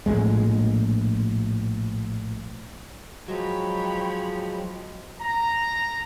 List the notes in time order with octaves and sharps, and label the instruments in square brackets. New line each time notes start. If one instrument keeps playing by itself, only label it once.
[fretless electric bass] A#1 D#2 A2 G#3
[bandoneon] F3 G#3 [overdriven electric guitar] F#3 [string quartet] C#5 G5 B5
[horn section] A#5